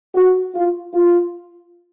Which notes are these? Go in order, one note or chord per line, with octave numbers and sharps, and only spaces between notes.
F#4
F4
F4